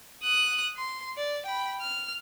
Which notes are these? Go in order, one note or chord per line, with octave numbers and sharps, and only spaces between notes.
D#6 F#6
C6
D5
G5 B5
F6